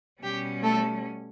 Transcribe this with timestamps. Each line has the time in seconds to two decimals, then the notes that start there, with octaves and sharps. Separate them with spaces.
0.23 B2 G3 C#4 G4
0.63 A3 A4